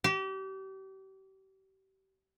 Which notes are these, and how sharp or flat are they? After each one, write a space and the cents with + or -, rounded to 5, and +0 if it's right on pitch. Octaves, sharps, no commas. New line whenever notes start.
G4 -35